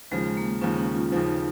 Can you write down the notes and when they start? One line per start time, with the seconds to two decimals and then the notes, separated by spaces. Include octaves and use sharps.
0.11 D#2 C#3 F3 G#3
0.37 A#3
0.61 D#2 C#3 F3 C#4
0.79 D#4
0.95 F4
1.12 D#2 C#3 F3 D#4